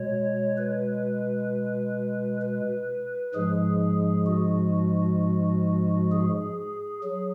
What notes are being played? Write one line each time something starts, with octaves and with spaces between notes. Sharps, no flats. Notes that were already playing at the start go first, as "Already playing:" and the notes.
Already playing: B2 G#3 C#5
B4
B4
G#2 F3 G#3 G#4
F#4
G#4
F#3 G#4